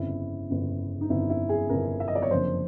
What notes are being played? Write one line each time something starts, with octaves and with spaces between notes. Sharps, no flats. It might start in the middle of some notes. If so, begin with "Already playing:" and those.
Already playing: G1 F2 C#3 E4
G1 F2 C#3
D#4
G1 F2 C#3 E4
E4
G#4
G1 F2 C#3 A#4
E5
D#5
D5
C#5
F#1 F2 D3 F3 C5